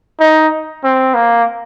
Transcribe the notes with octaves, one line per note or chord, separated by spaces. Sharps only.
D#4
C4
A#3